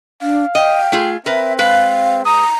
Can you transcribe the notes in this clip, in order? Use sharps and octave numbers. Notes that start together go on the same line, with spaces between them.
D4 F5
D#5 G5
A3 F4 G#4
C4 A#4 B4 E5
G#3 B4 F5
A#5 D#6